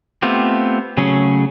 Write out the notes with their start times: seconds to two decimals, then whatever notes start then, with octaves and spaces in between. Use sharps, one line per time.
0.22 A3 B3 C4 F4 G4
0.97 C#3 F#3 A3 C#4 G#4